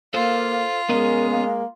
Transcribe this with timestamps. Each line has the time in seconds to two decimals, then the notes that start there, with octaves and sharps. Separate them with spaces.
0.14 A#3 F4 A4 C5
0.89 G#3 B3 C#4 A#4 D#5
1.30 A#3